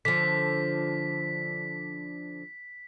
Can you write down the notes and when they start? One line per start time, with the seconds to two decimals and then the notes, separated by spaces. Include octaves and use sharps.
0.05 D3 F3 B6